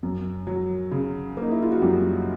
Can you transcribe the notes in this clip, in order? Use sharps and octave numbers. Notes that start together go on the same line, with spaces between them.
F#2
F#3
C#3
A#3 D#4
E4
F4
F#4
F#2 G3 G4